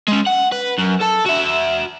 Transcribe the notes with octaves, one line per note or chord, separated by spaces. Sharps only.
G#3 C#4
F#5
B4
F#2
A4 A5
F#4 E5